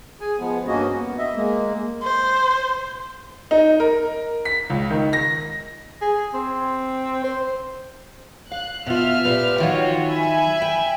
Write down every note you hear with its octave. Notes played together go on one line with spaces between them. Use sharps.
G#4 G#5
F3 G#3 B3
G2 A#3 C#4 F#4 D#5
B3
D#5 E5
G#3 A#3
C5
D#4
A#4
B6
C#2
D#3
A#6
G#4
C4
C5
F5 F#6
B2 F4 E5 F6
A#2 G3 B4
D#3 F#3 F4 F#4 C#5
E5 G#5 B5
G5